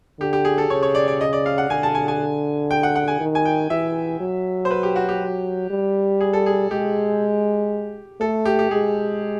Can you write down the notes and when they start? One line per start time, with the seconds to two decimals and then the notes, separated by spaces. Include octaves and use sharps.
0.20 D3 G4
0.33 G4
0.45 G#4
0.58 A4
0.70 C#3 C#5
0.83 C#5
0.95 D5
1.08 D5
1.21 D#5
1.33 D5
1.46 F5
1.58 F#5
1.70 D3 G#5
1.83 A5
1.95 G#5
2.08 G#5
2.71 G5
2.83 F#5
2.95 F#5
3.08 G#5
3.20 D#3
3.35 G#5
3.45 G5
3.70 E3 E5
4.20 F#3
4.65 C5
4.71 B4
4.83 G4
4.96 F#4
5.09 G4
5.71 G3
6.21 G#4
6.33 A4
6.46 G#4
6.71 G#3 G4
8.20 A3 A4
8.45 G4
8.59 G4
8.71 G#3 G#4